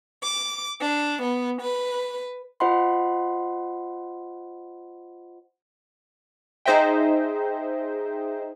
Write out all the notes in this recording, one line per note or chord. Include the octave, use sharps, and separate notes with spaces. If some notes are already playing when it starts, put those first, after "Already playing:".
D6
D4
B3
B4
F4 C5 D#5 F#5 B5 C6
D#4 G#4 C5 D#5 E5 G5